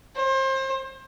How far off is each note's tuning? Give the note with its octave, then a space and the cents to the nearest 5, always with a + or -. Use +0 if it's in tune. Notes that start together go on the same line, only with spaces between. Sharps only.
C5 +30